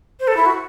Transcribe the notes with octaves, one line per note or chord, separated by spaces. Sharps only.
C5
A4
E4
F#4